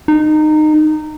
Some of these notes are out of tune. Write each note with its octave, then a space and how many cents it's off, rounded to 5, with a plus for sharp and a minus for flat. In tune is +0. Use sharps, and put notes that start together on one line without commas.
D#4 -20